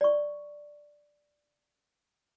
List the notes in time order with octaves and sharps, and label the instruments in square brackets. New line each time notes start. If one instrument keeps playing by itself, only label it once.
[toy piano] D5 C#6